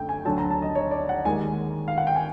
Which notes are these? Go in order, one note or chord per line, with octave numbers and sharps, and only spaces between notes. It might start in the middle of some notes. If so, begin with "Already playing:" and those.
Already playing: F#2 D3 A3 G5
G#5
D2 D3 F#3 A5
A#5
A5
D#5
C#5
D5
F#5
D#2 D#3 G#3 G#5
F5
F#5
G5
G#5